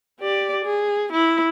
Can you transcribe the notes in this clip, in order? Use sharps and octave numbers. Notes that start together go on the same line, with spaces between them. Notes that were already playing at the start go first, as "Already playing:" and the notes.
G4 D5
G#4
E4